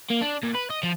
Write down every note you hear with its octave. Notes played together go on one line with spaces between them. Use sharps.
A#3
D4
A#2
B4
D#5
F3